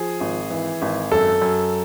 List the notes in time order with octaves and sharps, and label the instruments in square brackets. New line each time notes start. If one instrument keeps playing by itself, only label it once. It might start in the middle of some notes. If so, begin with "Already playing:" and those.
Already playing: [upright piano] F3 G#4
G#1
E3
G#1
F#2 A4
F#2